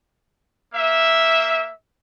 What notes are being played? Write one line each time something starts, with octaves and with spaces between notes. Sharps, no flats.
A#3 E5